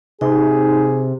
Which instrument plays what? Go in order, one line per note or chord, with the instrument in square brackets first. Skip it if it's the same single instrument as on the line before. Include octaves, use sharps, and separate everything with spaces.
[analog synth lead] C3 [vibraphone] D#4 [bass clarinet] G#4